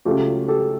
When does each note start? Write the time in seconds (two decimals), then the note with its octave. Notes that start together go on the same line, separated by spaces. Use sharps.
0.05 C#2 C#3 F#3 A3 F4 G4
0.48 G4 A4